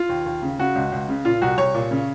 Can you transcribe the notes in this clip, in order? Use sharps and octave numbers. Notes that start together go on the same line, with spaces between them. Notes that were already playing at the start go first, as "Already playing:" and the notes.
Already playing: F4
D#2
D#2
C#3
C#3 F#4
C#2
C#2
C#3
A#2 F4
C2 F#4
C2 C#5
A#2
C#3